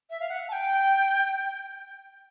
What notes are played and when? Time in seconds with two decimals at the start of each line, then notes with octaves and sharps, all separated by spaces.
0.10 E5
0.20 F5
0.28 F#5
0.48 A5
0.52 G5